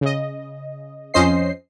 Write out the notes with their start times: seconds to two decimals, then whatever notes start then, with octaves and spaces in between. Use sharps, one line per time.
0.01 C#3 D#5
1.14 F2 F3 C#4 C5 D#5 C7